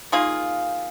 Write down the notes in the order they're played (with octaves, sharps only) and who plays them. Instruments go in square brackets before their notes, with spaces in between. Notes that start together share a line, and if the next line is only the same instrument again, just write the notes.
[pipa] D#3 A#3 F4 G#4